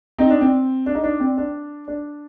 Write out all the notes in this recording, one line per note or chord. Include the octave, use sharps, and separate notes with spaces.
C4 D#4
D4
C4
D4
D#4
D4
C4
D4
D4